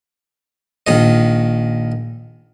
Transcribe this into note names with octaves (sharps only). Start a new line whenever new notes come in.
A#1 D#3 D#5